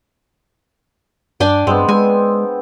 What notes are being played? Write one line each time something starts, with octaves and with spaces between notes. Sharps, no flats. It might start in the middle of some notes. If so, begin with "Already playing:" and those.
G2 D4 G5 G#5
G2 G#3 B3 C4
G#3 G#5